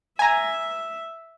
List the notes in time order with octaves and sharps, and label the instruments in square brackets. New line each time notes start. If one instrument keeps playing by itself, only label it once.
[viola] E5 [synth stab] G#5 A#5